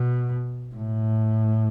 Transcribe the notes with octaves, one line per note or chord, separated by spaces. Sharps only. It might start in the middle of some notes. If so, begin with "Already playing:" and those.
Already playing: B2
A2